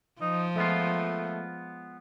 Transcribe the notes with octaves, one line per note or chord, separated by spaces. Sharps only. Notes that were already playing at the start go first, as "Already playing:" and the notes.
F3 D#4
G#3 A3 B3 F4